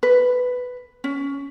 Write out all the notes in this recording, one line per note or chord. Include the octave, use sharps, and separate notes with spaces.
B4
C#4